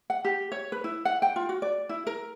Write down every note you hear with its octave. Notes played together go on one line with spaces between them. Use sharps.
F#5
G4
C#5
B4
E4
F#5
G5
F4
F#4
D5
E4
A#4